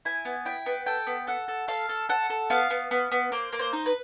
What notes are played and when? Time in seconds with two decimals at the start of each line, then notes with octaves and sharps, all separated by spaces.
0.05 E4 G#5
0.25 B3
0.45 E4 G5
0.66 B3
0.86 A4 G5
1.07 B3
1.27 A4 F#5
1.48 A4
1.68 A4 F5
1.89 A4
2.09 A4 F#5
2.30 A4
2.50 B3 F5
2.70 B3
2.91 B3
3.12 B3
3.32 A#3 C5
3.52 A#3
3.59 C5
3.73 D#4
3.86 B4